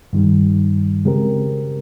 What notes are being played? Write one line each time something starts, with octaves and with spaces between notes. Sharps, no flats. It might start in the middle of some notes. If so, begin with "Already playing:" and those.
G2 D#3 G3
C#3 G#3 C4 G4 A#4